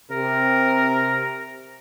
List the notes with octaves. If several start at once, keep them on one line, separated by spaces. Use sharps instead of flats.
C3 A#4